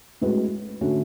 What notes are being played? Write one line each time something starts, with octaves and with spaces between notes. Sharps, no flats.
A2 G#3 C#4 F#4 B4
D3 A3 C#4 F#4